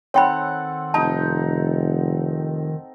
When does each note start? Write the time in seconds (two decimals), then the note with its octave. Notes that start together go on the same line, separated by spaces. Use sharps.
0.14 D#3 C4 A4 C#5 F#5 G5 B5
0.94 F1 D#4 A5